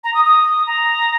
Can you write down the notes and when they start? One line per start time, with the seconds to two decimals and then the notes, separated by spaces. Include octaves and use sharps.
0.04 A#5
0.14 D#6
0.25 D#6
0.67 A#5